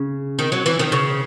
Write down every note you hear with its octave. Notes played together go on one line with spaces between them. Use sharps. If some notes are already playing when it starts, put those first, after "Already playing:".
Already playing: C#3
D#3
F#3
E3
D#3
C#3